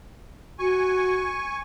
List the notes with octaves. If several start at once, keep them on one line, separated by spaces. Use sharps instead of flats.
F#4 G#5 C#6